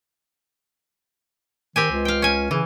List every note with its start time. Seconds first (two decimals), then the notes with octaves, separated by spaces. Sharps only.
1.76 D#3 C4 G4 G#5
1.91 C#2
2.05 F5 G5
2.22 C#4 G#5
2.51 C#3 E3